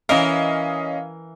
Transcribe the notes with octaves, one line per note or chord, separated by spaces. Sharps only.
E3 C#4 A#4 D#5 F5